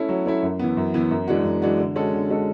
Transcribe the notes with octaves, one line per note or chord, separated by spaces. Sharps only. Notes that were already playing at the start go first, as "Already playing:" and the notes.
Already playing: A3 C#4 E4
F#3
A3 C#4 E4
F#2
E3 B3
F#2
E3 B3
F#2
E3 G#3 D4 F#4
F#2
E3 G#3 D4 F#4
D3
G#3 C#4 F#4 A4
D3
G#3 C#4 F#4 A4